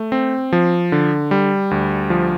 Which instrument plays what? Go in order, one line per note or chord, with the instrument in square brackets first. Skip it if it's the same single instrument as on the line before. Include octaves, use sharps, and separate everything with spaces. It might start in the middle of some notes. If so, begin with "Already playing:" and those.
Already playing: [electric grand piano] A3
C4
F3
D3
G3
D2
F3